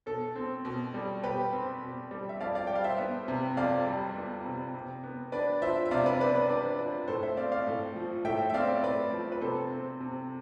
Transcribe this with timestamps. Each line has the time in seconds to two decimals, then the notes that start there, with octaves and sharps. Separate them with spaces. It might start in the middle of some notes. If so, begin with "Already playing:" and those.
0.06 B2 A4
0.35 C4
0.65 B2
0.94 G3
1.23 B2 G4 B4
1.53 C4
1.82 B2
2.11 G3
2.29 E5
2.40 F2 D5 F5
2.55 D5 F5
2.67 G3 G5
2.75 F5
2.84 C5 E5
2.98 B3
3.28 C3
3.57 F2 D5 F5
3.87 G3
4.16 B3
4.45 C3
4.74 C3
5.03 B3
5.32 D4 B4 D5
5.62 F3 C5 E5
5.85 E5
5.91 C3 D5 F5
6.06 B4 D5
6.20 B3 B4 D5
6.35 B4 D5
6.49 D4 B4 D5
6.79 F3 B4 D5
7.08 A2 A4 C5
7.23 C5 E5
7.37 C4 D5 F5
7.52 D5 F5
7.67 A2
7.96 F3
8.25 A2 E5 G5
8.50 E5
8.54 C4 D5 F5
8.83 A2 B4 D5
9.12 F3
9.32 B4
9.41 C3 A4 C5
9.71 C4
10.00 C3